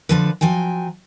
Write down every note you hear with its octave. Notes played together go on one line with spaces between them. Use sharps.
D3 F3 B4
F3 F#3 G5 G#5